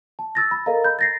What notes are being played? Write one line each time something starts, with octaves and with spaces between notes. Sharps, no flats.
A5
E6 A6 A#6
B5
A4 A#4 D#5 F5 A#5
D#5 B5 G6
A6 A#6 C7